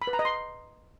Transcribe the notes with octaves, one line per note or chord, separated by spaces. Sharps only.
B5
B4
A#5
D#5
C6